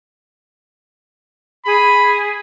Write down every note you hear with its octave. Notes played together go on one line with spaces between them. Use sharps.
G#4 B5